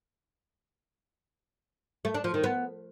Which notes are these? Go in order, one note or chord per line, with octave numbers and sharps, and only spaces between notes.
A3
D4
F3
D#3
B3